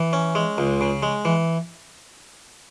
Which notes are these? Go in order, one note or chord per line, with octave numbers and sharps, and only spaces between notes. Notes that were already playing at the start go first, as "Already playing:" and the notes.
Already playing: E3
C#4
G#3
C#2
C#3
G#3
E3